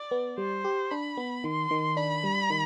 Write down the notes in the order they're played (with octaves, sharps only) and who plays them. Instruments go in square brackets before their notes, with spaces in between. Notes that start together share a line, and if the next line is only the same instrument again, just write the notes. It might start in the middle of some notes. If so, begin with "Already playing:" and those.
Already playing: [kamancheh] D5
[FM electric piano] B3
[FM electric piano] G3 [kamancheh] C5
[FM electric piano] G4
[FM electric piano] D4 [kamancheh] B5
[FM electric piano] B3
[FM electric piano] D#3 [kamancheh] C6
[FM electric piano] D#3
[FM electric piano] D4 [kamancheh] B5
[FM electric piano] G3
D#3